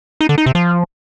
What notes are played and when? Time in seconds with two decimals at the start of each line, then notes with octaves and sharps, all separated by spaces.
0.21 D#4
0.29 D3
0.38 D#4
0.46 C3
0.55 F3